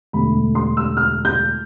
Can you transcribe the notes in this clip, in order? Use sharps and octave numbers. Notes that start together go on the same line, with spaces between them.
E1 D2 D3 A3 B5
C6
E6
F6
G6